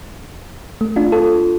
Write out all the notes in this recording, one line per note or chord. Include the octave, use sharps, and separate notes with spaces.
A3
D4 F4
F4 A4